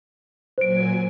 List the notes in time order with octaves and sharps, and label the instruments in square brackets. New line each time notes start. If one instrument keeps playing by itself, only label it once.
[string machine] A#2 F#3 G#5 [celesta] C5 D7